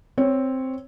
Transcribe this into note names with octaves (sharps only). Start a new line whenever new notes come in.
C4 C#5